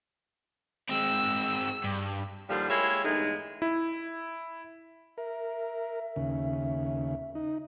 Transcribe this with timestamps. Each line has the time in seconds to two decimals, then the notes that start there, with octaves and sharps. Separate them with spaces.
0.89 G#3 C4 E6
1.84 G2
2.50 D#2 D3 F3 G3
2.70 G#3 A#3 E4 G4 C#5
3.05 E2 G2 G#3 A3 D#4
3.62 E4
5.18 A#4 E5
6.16 D#2 C#3
7.35 D#4